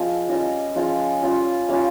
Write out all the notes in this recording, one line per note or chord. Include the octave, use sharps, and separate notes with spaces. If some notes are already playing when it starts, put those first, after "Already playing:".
Already playing: F3 G#3 C4 F4 D#5
G3 C#4 F4 D#5
F3 G#3 C#4 F4 F5
G3 C#4 F4
G3 C#4 F4 F5